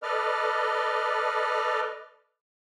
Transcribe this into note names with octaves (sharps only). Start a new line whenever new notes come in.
A4 B4 D5 D#5 F6